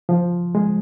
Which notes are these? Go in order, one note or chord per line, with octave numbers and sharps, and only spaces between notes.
F3
G#3